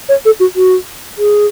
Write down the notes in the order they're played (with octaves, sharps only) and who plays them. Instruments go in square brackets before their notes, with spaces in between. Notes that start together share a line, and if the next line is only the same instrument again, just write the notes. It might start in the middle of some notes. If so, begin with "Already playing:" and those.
[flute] C#5
A4
F#4
F#4
G#4